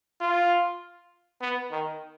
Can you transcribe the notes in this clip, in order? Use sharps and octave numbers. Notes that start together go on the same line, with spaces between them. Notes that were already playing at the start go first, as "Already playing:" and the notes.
F4
B3
D#3